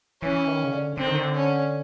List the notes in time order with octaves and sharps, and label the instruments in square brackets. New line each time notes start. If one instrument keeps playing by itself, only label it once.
[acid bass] E3 [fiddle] C#4
[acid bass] D#3
C#3
D3
[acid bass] D3 [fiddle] C4
[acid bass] D#3
D3
[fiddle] C#4